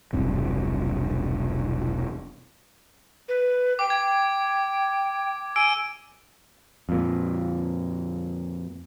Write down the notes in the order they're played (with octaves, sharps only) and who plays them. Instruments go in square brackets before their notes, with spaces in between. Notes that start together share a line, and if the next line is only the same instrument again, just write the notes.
[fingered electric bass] E1 B1 G2 C3
[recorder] B4
[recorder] G5 [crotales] D6
[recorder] G5 [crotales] G#6
[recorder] G#5 [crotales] E6 D7
[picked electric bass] F2 A#2